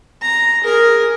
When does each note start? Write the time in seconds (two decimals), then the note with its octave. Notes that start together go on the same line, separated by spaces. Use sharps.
0.22 A#5
0.63 G#4 A#4